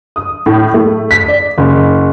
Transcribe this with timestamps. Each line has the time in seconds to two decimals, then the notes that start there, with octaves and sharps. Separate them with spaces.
0.16 D#6
0.46 A2
0.74 A3
1.11 B6
1.28 D5
1.58 F#1